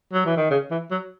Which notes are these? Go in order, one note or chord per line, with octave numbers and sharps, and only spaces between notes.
F#3
E3
D#3
C#3
E3
F#3